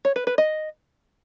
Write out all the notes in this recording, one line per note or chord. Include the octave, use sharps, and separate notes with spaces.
C#5
B4
B4
D#5